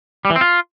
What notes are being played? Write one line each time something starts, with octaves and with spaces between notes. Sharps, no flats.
G3
E3
C4
F4